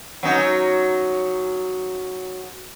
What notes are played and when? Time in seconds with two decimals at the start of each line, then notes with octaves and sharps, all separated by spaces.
0.23 F#3 C#4 D#4